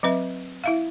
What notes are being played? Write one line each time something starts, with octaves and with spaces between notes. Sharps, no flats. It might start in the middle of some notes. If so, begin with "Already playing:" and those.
F#3 C4 B4 E5
E4 E5 F5